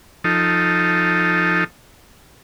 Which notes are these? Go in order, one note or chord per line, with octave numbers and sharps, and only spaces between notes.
F3 D#4 A4